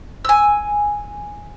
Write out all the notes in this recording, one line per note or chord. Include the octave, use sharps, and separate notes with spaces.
G#5 E6